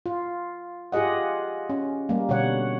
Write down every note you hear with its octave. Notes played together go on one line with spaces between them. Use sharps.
F4
F4 G4 G#4 D#5 F#5
C#4
G3 A#3
B2 D3 G3 C#5 F#5